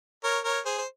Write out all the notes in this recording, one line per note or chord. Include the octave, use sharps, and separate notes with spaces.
A#4 C#5
A#4 C#5
G#4 C5
C5